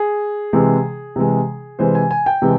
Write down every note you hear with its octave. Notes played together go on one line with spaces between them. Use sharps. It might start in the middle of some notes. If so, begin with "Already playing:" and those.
Already playing: G#4
C3 E3 G#3
C3 E3 G#3
C3 E3 G#3 C5
G#5
G#5
G5
C3 E3 G#3